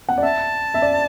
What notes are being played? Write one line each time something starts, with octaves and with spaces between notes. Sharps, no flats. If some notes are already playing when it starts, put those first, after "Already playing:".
F#5
D5
E5 A5
E5
D5